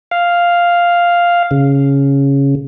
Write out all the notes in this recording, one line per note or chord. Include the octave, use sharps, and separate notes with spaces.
F5
C#3